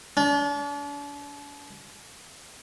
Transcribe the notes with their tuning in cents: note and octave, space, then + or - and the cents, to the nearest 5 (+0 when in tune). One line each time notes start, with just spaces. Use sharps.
D4 -40